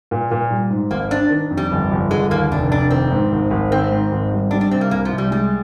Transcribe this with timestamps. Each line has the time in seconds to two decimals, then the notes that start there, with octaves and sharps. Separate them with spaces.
0.11 A#2
0.31 A#2
0.50 G3
0.70 G#2
0.90 G#1 A#3
1.11 C4 D4
1.30 D#3
1.51 F2
1.57 G3
1.71 G1
1.91 G1
2.11 D3 G#3
2.31 D#2 A#3
2.51 F1 D4
2.71 F1 D4
2.91 D#3 C4
3.12 G#2
3.32 G#1
3.51 G#1
3.71 D#3 C4
3.92 G#2
4.12 G#1
4.32 G3
4.51 G3 D4
4.61 D4
4.71 C3 C4
4.81 A#3
4.91 C2 A#3
5.05 F3
5.11 C2
5.18 G3
5.31 G3 G#3